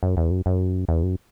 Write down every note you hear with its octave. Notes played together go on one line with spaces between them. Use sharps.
F#2
E2
F#2
F#2
E2
F#2